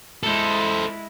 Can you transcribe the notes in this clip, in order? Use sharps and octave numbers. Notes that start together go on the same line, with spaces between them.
G#3 E4 A4 C5